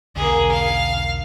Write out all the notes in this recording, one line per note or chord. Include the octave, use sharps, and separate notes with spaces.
E1 B1 D3 A#3 G#4
F5